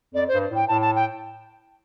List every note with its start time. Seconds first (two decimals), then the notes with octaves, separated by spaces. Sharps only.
0.14 F2 D5
0.28 C5
0.33 G2
0.51 A2 G5
0.68 A2 A5
0.81 A5
0.96 G5